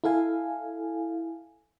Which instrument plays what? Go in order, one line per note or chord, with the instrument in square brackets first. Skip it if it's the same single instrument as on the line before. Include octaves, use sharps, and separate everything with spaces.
[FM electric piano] E4 A4 F5 G#5